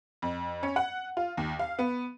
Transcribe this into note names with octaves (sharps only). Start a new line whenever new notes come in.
F2
C#4
F#5
F4
D#2
F5
B3